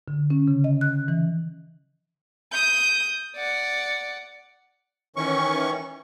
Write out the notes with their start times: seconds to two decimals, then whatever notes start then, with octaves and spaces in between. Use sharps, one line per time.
0.08 D3
0.30 C#4
0.48 C#3
0.64 D#5
0.81 F#6
1.08 E3
2.52 D#6 G6
3.36 D5 F#5
5.16 D#3 E3 C#4 C#6